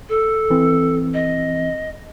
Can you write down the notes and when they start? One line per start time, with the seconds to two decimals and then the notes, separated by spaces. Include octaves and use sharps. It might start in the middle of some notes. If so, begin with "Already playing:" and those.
0.09 A4
0.50 E3 C4
1.14 D#5